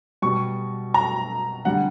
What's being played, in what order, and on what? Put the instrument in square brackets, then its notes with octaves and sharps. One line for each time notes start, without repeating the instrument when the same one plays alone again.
[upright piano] B2 G3 C#6
A#5
D3 G3 F#5